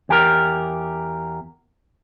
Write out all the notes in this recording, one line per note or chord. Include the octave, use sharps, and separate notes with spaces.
E2 G4 A#4